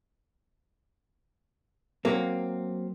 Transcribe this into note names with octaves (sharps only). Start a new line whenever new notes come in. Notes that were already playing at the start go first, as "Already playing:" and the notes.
F#3 A#3 C4